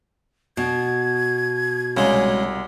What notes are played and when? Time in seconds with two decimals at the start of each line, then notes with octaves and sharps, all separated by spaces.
0.57 B2 G#6
1.97 C2 C#3 G#3